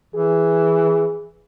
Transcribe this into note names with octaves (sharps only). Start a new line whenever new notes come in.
E3 G#4